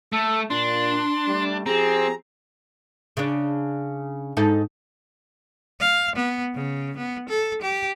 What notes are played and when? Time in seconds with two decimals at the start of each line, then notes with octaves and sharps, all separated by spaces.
0.13 A3 A4
0.50 A#2 D4 C6
1.27 G3 A3
1.66 F3 C4 G4 G#4 A#5
3.17 C#3 D4
4.37 G#2 D#4 A4
5.80 F5
6.15 B3
6.54 C#3
6.97 B3
7.29 A4
7.62 G4